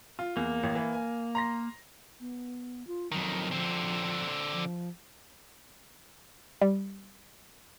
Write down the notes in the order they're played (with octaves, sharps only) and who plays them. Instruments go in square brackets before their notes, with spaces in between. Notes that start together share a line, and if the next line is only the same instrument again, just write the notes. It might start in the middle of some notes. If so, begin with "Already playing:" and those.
[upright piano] F4
[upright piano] E2 [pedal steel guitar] A#3
[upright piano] A1
E3
G#5
A#5 C6 A#6
[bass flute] B3
F4
[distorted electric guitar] F2 D#3 [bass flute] F#3
[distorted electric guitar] D3 C4 [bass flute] F3
[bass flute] F3
[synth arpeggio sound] G3